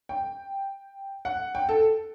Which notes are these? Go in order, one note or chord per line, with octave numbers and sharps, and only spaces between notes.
G5
F#5
G5
A4